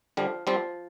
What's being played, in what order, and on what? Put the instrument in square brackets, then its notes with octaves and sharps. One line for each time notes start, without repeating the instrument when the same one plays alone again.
[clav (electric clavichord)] D3 G3 [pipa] F3
[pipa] F3 [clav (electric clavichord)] G3 C4